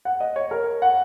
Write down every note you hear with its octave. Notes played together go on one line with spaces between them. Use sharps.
F#5
D#5
C#5
A#4
F#5